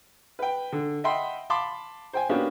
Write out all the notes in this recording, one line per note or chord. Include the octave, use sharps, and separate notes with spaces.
B4 G5
D3
D#5 E5 F#5 G5 B5 C6
F5 A5 B5 C6 D6
C5 G5 G#5
A#3 B3 C#4 D4 F#4 G4